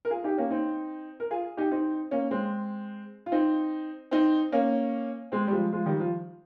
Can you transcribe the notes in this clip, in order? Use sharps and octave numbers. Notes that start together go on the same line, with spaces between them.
A#4
F4 G#4
D#4 G4
A#3 C#4
C4 D#4
A#4
F4 G#4
D#4 G4
C4 D#4
A#3 C#4
G#3 C4
F4
C4 D#4
C4 D#4
A#3 C#4
G#3 C4
G3
F3 G#3
F3 G#3
D#3 G3
F3